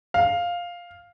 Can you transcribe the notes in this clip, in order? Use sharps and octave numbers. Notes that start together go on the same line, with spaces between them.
F5